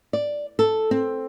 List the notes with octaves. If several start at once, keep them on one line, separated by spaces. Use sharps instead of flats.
D5
A4
C4